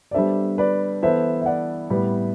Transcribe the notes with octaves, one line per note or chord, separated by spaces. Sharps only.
D5
G3 B3 D4 A4 C5 E5
B4 D5
E3 B3 E4 A4 C5 E5
E5
D5 F#5
A2 G3 B3